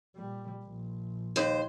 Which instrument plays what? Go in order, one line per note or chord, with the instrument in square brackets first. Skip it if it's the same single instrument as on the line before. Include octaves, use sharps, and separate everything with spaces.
[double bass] A#2 G3
A#1
[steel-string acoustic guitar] D#2 C5